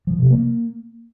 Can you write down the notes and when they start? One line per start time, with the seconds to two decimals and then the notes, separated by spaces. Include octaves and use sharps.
0.07 F3
0.19 C3
0.31 A#3